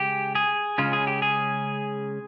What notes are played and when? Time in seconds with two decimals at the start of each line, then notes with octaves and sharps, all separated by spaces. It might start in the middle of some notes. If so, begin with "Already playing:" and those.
Already playing: C#3 G#3 G4
0.35 G#4
0.78 C#3 G#3 C#4 F4
0.93 G#4
1.07 G4
1.22 G#4